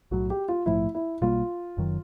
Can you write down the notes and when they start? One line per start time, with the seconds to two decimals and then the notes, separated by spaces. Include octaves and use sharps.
0.11 B1 A2 F#3 F#4
0.30 G4
0.48 F4
0.66 A#1 G#2 F3 A3 E4
0.95 E4
1.22 B1 B2 G3 A#3 F4
1.77 F#1 F#2 D#3 F#3